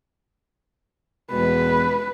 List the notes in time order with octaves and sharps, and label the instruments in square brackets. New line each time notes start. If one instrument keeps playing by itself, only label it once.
[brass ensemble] E2 B2 G#3 [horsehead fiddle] B4